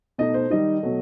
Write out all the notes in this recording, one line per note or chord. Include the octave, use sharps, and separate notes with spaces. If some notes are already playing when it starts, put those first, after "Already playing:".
B2 A3 D#4 D#5
C5
D#3 G3 D#4 D#5
B2 F#3 A3